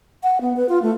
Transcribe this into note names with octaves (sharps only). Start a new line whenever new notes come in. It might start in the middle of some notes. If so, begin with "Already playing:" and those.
F#5
B3
B4
F4
A3